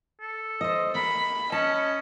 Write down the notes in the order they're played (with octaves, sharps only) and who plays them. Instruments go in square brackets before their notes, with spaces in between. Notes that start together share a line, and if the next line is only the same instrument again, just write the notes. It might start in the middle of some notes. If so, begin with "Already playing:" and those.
[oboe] A4
[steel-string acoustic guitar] C5 D#5
[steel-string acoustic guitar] A#3 [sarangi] B5
[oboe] C#4 [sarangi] D#5 [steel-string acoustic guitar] A5